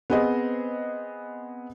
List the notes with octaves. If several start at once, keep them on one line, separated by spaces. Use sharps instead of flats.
B3 C4 G#4 C5 D#5